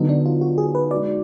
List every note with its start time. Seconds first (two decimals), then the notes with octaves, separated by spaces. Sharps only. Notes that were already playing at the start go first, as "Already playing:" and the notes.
Already playing: D3 F#3 B3 D#4
0.09 D4
0.26 F4
0.41 F#4
0.58 G#4
0.75 B4
0.91 G#3 D#4 F#4 D5